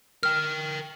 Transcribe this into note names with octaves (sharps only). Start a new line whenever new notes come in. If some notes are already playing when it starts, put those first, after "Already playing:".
A#4 G5 F6